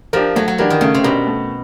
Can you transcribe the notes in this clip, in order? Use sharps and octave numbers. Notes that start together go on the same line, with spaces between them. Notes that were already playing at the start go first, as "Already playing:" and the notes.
F3 D4 G4 A#4
F#3 A3
F#3
E3 D4 G4 A#4
D#3
C#3 A3
C3
B2 D4 G4 A#4
A3